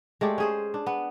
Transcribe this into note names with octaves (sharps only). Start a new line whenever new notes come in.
G#3 A3 G4 D5
C#4 G#4 C5
D4
B3